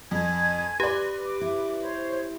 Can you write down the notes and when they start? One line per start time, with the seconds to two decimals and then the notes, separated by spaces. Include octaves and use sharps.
0.11 F2 G#5 G#6
0.80 G4 B4 D5
1.23 D6
1.41 E4
1.81 C5 C#5